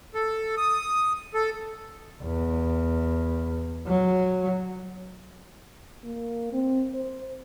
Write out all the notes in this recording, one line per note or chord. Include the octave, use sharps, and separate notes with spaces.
A4
D#6
A4
E2
F#3
A#3
C4
C5